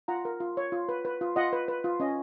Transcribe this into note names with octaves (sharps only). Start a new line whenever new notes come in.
F4 F#5 A#5
A#4
F4
C#5
F4
B4
B4
F4
F4 D#5 F#5
B4
B4
F4
C#4 D#5